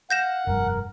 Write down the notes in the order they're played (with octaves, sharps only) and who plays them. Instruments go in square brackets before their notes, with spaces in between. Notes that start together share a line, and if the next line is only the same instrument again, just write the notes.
[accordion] F5 [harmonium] F#5 [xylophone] G6 A#6 E7
[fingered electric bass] F1 G2 [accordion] A#4